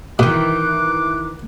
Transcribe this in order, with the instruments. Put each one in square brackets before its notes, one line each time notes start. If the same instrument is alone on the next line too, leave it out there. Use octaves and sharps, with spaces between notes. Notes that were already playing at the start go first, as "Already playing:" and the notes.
[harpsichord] B2 [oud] D#3 E3 [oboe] D6 [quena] F#6